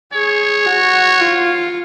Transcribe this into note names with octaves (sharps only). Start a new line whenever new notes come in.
G#4 C#5
F#4
F4